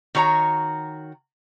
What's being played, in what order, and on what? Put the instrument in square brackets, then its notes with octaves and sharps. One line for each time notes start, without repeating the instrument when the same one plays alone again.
[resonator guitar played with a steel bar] D#3 F#4 C#5 A#5